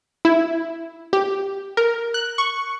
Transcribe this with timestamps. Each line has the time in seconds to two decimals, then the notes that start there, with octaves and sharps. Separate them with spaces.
0.25 E4
1.13 G4
1.77 A#4
2.14 F#6
2.38 C#6